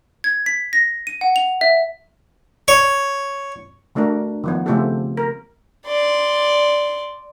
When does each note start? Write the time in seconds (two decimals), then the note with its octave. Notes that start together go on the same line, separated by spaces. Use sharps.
0.24 G#6
0.46 B6
0.73 A#6
1.07 D#7
1.21 F#5
1.36 F7
1.61 E5
2.68 C#5
3.95 D3 A3 D4 F#4 A#4
4.44 D#3 F3 B3
4.66 C#3 A3 C4 F4 G4 A4
5.17 A#4
5.86 D5 C6